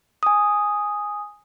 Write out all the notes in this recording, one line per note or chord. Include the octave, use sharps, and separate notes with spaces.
G#5 D#6